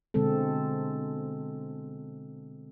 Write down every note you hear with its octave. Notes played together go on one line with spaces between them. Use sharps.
B2 D3 G#3 C4 A4